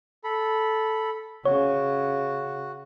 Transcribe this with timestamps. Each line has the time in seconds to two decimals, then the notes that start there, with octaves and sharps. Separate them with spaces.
0.24 A4 B5
1.45 C#3 F#4 C#5